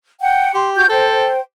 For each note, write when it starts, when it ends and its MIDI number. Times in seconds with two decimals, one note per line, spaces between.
0.21 0.52 78
0.21 0.52 79
0.55 0.84 67
0.55 0.71 84
0.76 0.88 66
0.76 0.88 91
0.89 1.30 69
0.89 1.39 72
0.89 1.39 79